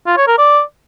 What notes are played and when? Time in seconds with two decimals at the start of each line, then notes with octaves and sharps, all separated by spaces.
0.06 F4
0.17 C#5
0.27 A#4
0.38 D5